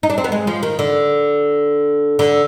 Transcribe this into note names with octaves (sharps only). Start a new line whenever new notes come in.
D#4
D4
C4
B3
G#3
F3
D#3
D3
D3